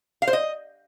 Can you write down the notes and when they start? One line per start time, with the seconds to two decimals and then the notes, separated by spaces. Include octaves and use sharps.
0.22 F5
0.27 C5
0.33 D#5